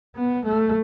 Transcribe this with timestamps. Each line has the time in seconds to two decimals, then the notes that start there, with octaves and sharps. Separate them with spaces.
0.16 B3
0.45 A3